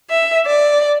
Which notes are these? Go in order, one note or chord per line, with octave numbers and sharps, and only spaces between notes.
E5
D5